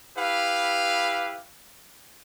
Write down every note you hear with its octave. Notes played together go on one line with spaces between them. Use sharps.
E4 G4 B4 F5